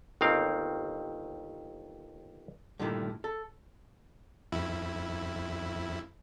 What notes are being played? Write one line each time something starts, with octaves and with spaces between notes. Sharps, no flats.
G1 D#2 D#3 C4 F5
G2 A#2 D3 D#3 A3 E4
A4
F2 E4